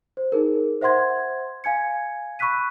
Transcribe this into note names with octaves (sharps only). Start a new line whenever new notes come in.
C5
D#4 G#4 A#4
C5 E5 F#5 C6 G#6
F5 G#5 G#6 C#7
B5 C#6 E6 F#6 B6 D#7